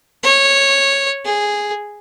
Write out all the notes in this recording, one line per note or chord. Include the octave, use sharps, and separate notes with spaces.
C#5
G#4